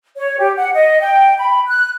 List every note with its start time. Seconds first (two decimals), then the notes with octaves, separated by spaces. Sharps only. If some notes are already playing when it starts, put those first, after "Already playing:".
0.16 C#5
0.39 G4
0.57 F#5
0.75 D#5
1.01 G5
1.38 B5
1.68 F#6